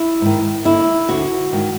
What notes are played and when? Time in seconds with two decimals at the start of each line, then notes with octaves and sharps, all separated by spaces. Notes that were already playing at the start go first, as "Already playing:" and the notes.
Already playing: E4
0.21 G#2 D#3
0.65 D#2 D3 E4
1.08 D2 D3 F#4
1.52 G#2 D#3